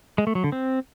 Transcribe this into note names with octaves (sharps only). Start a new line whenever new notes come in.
G#3
A3
F#3
D3
C4